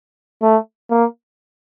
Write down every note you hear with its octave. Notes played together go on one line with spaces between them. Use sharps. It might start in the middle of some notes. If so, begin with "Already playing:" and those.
A3
A#3